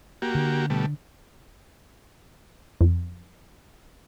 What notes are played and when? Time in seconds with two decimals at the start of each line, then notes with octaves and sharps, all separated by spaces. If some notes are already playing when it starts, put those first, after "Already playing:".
0.22 A#3 F#4 G4
0.35 D3
0.70 B2 G3 A3
2.81 F2